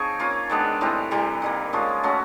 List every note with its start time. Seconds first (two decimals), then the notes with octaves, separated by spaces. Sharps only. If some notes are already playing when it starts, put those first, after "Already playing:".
Already playing: F3 C4 D#4 G#4 C#5
0.19 A#3 C#4 F4
0.50 D#3 G#3 B3 D4
0.81 A2 E3 G3 C4
1.11 C3 E3 G3
1.42 D#3 G3 A#3
1.73 F3 G#3 C#4 F4
2.03 F#3 A3 C#4 F#4